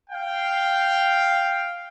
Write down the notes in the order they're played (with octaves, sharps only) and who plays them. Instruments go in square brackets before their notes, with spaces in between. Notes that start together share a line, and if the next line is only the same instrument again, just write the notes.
[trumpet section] F5 G5